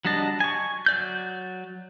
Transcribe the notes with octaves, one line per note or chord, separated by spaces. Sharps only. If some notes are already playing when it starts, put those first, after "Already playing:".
F#3 G3 D4 D#5 A5
G#5 C#6
F#3 D5 G6